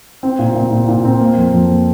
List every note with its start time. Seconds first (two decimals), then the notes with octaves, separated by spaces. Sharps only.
0.23 C4
0.39 A#2
0.55 A#2
0.72 A#2
0.89 A#2
1.05 C4
1.20 A#3
1.37 F2
1.54 F2
1.70 A#3